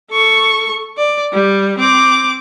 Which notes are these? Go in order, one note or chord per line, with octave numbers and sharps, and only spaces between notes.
A4 C#6
D5
G3
C4 D6